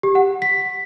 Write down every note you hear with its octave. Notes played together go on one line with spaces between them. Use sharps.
G4
F#5
B6